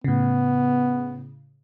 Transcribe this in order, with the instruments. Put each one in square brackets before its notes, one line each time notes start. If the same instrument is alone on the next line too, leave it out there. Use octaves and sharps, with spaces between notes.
[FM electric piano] A2 C#3 [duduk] B3